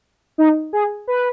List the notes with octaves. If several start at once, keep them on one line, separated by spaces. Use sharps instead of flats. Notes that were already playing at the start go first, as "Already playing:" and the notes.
D#4
G#4
B4